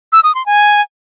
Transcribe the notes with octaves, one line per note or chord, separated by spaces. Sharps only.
E6
D#6
C6
G#5